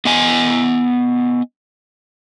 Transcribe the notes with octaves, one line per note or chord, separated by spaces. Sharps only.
B3 D#5 G#5